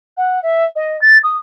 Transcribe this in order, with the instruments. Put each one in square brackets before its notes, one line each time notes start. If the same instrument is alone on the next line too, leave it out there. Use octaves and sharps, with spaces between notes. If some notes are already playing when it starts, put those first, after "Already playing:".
[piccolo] F#5
E5
D#5
A6
D#6